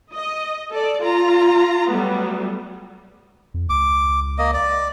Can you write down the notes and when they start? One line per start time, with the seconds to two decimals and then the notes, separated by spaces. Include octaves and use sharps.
0.13 D#5
0.70 A4 D5
1.02 F4 A#5
1.89 F#3 G3 A3 B3
3.54 F2
3.70 C#2 D6
4.38 A#3 D#5
4.54 D5